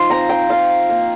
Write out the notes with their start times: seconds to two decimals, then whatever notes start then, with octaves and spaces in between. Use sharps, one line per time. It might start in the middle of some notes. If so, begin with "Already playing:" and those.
Already playing: F3 D#4 C5 C6
0.10 C4 A#5
0.29 G5
0.49 F4 F5
0.89 A#3